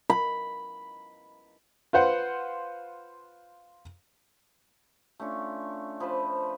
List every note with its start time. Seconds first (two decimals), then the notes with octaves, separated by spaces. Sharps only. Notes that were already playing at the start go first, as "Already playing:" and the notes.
0.10 B5
1.93 F4 B4 C5 F#5
5.20 A3 C#4 D4 F4
6.00 F3 B4 C5 A5